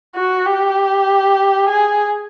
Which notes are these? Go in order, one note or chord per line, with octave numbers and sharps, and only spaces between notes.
F#4
G4
G#4